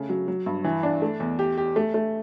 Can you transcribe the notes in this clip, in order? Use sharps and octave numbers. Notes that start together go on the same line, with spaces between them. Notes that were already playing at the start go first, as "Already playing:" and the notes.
Already playing: C#3 A3
F#3
F#3
G2
E3
D4
A3
E2
G4
G4
A3
A3